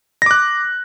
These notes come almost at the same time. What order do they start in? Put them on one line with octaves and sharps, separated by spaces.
A#6 D6 F#6